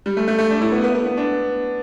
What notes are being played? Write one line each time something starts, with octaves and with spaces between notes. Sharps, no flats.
G3
A3
A3
A3
D4
E4
B3
B3
B3
B3
D4